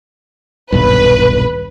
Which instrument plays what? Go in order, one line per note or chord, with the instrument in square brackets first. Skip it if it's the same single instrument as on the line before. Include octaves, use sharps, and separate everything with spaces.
[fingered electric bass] D#1 B1 G2 [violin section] B4